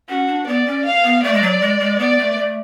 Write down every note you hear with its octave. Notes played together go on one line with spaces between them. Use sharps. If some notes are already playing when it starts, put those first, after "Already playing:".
C#4 F#4
D4
B3 D5
C#4
F5
B3
A3 D5
G#3
F#3
G#3
G#3
B3 D5
A3
A3